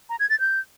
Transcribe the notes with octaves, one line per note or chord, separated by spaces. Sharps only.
A#5
G#6
A6
G6